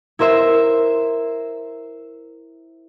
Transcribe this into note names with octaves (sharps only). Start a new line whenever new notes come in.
E4 A#4 C5 E5